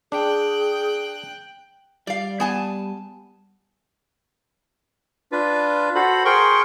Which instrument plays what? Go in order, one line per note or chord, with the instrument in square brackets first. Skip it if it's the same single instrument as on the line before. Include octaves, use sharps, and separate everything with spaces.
[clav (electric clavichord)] D4 [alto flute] G#4 [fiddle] G5 F#6
[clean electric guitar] G3 [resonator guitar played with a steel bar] D5 F5
[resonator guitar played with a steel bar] B3 G#5 A5
[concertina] D4 F4 B4
F#4 A4 C5 B5
G#4 A#4 C5 G5 C6 C#6